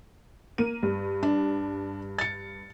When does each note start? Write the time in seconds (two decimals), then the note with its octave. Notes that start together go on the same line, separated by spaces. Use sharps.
0.58 A#3 D#7
0.83 G2
1.23 D4
2.19 A6 C#7